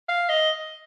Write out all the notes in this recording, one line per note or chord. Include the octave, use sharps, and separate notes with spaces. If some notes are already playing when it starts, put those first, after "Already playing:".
F5
D#5